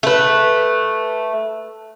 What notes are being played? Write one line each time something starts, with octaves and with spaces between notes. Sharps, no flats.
A3 B4